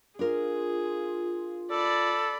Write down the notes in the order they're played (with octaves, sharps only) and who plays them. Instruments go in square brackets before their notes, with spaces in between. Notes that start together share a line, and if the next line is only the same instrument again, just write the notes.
[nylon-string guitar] D4 A#4 [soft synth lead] F4 [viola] G#4
[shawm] A4 [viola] D5 B5